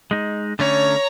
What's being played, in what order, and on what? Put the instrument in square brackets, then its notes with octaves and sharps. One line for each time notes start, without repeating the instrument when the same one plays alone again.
[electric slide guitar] G#3 D#4
[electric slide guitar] D3 A3 C#4 [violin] C#5 A#5